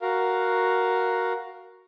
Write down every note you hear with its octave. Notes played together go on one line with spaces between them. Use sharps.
F#4 A#4 F5